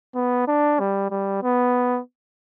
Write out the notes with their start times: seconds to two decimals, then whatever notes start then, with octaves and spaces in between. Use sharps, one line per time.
0.15 B3
0.48 D4
0.80 G3
1.11 G3
1.43 B3